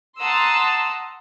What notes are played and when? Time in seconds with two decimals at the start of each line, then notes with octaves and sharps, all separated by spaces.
0.20 F#5 A5 A#5 C6 D#6 E6